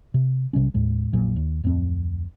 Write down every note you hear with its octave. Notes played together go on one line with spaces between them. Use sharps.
C3
B1 C3 G3 C#4
D#2 A2 G#3
F1 A#1 A#2 F#3
D#2
D1 F2 A2 C4